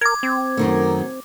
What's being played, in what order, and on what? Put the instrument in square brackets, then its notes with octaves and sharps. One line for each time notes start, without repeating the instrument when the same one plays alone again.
[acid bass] A#4 [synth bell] D6 G#6
[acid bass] C4
[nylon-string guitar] F#2 D#3 A3